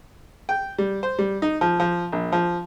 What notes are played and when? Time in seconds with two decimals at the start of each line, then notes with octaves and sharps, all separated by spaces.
0.49 G5
0.78 G3
1.03 C5
1.19 G3
1.42 D#4
1.61 F3
1.80 F3
2.12 A#1
2.32 F3